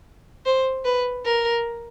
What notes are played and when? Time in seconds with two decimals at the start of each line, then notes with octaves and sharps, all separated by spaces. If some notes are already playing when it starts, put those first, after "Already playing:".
0.46 C5
0.85 B4
1.25 A#4